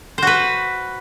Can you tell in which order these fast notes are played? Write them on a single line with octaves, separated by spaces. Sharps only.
C5 F#4 B4